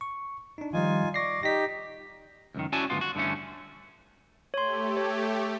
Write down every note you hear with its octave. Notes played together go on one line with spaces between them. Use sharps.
C#6
D4 D#4
D#3 F3 G3 D#4 F4 G#5
D5 C#6 A#6 C7
D#4 G4 A#6 B6
C#2 F#2 D#3
C#4 E4 F#4 D5 G#5 A5
D2 G2 A#2 F#3 B3 F4
F#4
G2 D3 E3 A3 C#4
A3 G4 C#5 C6
C#5